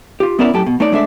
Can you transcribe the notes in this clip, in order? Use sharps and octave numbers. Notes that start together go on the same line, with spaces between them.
F4 G4
B3 C#4 E4 A#4 D5 E5
F#2 A2 G4 A4
B2
A3 D#4 C#5 D5
G#3 A3 D4 A4 D5 E5